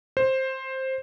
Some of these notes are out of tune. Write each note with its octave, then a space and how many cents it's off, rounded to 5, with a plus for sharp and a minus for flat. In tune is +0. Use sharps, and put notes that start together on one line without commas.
C5 +10